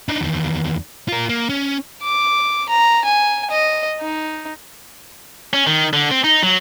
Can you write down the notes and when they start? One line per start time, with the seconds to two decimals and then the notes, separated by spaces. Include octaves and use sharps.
0.09 D4 D#4
0.21 E2 D#3
1.09 F4 A#4
1.29 A#3
1.49 C#4
2.03 D6
2.69 A#5
3.05 G#5
3.51 D#5
4.01 D#4
5.53 C#4
5.67 D#3
5.93 D3
6.11 C4
6.24 D#4
6.43 F#3